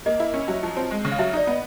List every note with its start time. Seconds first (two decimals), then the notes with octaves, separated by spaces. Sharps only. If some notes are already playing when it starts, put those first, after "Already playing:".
0.06 A#3 D#5
0.20 E4
0.34 C#4
0.48 F#3
0.63 F3
0.77 C4
0.91 G#3
1.05 C#3
1.12 F5
1.19 F#3 E5
1.33 D#4 D5
1.47 B3 D#5